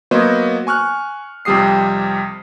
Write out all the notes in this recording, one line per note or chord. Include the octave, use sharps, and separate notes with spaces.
F#3 A#3 B3 C5 C#5 D#5
G#5 C#6 F6 F#6
F2 C3 G3 G4 D#6 C7